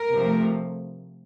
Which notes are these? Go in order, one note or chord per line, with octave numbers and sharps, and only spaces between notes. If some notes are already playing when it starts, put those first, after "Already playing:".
Already playing: A#4
C3 F3 A3